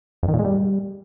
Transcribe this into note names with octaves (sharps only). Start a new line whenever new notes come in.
F2
D#3
A#2
G#3
G3